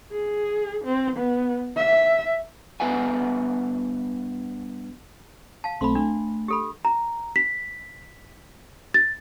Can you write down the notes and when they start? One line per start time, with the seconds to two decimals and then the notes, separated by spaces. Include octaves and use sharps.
0.12 G#4
0.85 C4
1.16 B3
1.77 E5
2.80 G2 B3 B4 E5 F5 G#5
5.64 F5 A5
5.81 B1 A3 C4 B5 C6
5.95 A3 D4
6.48 G4 A4 B5
6.85 A#5
7.36 B6
8.94 A6